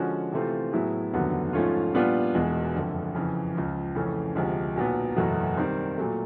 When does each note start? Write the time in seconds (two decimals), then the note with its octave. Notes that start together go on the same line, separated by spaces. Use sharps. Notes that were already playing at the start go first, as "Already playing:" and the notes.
Already playing: D3 F3 G#3 C#4 F#4
0.32 C3 E3 A3 C4 F4
0.72 A2 F#3 B3 E4 G#4
1.13 F1 D#2 D3 F#3 B3
1.53 G#2 F3 A3 C#4 F4
1.93 A#2 G3 B3 D4 F4
2.34 E1 E2 B2 G#3
2.75 F#1 F2 D3
3.15 F2 C#3 E3
3.55 C#2 C#3 F3
3.95 F2 C#3 E3 A3 C#4
4.35 D2 C3 F3 G#3
4.76 B1 A#2 F#3 B3
5.16 F#1 E2 B2 F#3 A3
5.57 D#3 G3 C4
5.98 A#2 F#3 A3